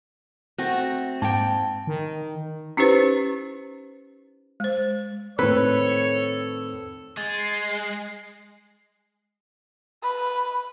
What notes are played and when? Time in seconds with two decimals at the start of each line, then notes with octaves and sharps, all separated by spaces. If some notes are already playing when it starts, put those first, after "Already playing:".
0.58 A3 C4 F#4
1.22 G#2 A#3 G5 A5
1.87 D#3
2.77 C#4 D#4 E4 G4 B4 C5
4.60 G#3 C5
5.39 A2 D#3 C4 A4 B4 C#5
7.17 G#3 A6
7.39 C7
10.03 B4